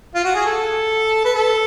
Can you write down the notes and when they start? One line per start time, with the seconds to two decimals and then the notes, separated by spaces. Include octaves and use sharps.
0.15 F4
0.25 F#4
0.35 G#4
0.46 A4
1.25 B4
1.35 A4